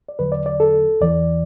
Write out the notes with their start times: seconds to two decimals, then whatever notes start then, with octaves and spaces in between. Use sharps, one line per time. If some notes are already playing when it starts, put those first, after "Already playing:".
0.09 D5
0.19 E2 D3 F#3 B4
0.32 D5
0.46 D5
0.60 A4
1.01 E2 E3 D5